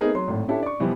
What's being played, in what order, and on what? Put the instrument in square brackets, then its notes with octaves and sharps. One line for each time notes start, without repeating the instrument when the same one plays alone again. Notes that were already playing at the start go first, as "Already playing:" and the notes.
[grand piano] A3 B3 C4 D#4 G#4 A#4
F#3 C6
G#1 A2
C#4 D4 E4 G4 A4
D5 C#6
B2 E3 F3 G3 B3